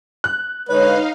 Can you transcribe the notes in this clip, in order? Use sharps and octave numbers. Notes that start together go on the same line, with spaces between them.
F#6
D3 G#3 D#4 B4 C#5 F5